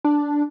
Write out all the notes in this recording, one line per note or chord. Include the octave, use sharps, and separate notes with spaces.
D4